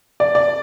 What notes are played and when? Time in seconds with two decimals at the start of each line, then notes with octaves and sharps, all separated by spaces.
0.20 D5
0.35 D5